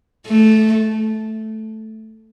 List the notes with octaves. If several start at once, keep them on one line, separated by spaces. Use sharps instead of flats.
A3